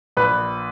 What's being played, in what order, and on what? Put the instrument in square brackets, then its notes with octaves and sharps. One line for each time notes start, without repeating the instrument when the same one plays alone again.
[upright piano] A#1 B4